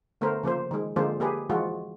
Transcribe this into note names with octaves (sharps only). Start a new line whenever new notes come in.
D3 A3 B3 A#4 C5
C#3 F3 A#3 C5
D#3 G#3
D3 F3 G#3 A#3 F4 C5
A#3 G4 G#4 B4
E3 F3 G#3 F4 F#4